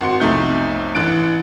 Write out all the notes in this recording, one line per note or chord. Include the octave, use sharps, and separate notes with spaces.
G#1 F#4 C6 C#7
B1 F2 C3 A3 D#4 G6
A1 E3 F#6 A6 D7